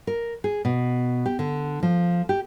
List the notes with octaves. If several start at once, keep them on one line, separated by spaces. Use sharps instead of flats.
A#4
G#4
B2
G4
D3
F3
G4